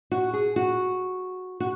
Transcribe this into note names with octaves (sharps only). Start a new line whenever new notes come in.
F#4
G#4
F#4
F#4